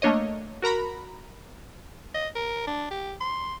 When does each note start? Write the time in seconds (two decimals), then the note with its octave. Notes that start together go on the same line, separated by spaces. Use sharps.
0.02 A3 A#3 D4 C#5 D#5
0.62 F#4 A#4 A#5 B5
2.14 D#5
2.35 A#4
2.67 D4
2.90 G4
3.20 C6